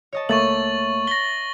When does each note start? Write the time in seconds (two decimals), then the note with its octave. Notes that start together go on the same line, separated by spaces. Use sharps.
0.13 C#5 D#5 A5
0.29 C#2 A3 A#3 E5 C#6 A6 F#7
1.07 A#6 B6 G7